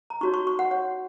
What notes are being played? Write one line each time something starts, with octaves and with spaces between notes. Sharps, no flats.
A#5
D#4 F#4 C#5 C#6
C#6
C#6
F#5
F#4 C#5 F#5